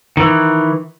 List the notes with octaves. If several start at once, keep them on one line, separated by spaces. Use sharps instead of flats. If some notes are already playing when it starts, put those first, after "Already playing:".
D#3 E3